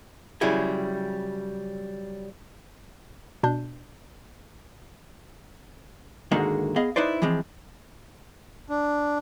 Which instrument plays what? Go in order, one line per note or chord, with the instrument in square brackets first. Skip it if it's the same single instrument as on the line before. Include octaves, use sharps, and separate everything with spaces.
[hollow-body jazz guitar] C#3 F#3 G3 E4 G#4
[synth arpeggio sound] B2 D4 G6
[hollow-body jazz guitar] G#2 D3 D#3 G#3 A#3 F#4
B3 G#4 D#5 F5
D#4 E4 B4 C5 D5
E3 F3 G#3 C4
[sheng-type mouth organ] D4